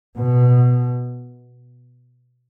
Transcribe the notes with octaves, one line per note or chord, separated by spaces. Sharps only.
B2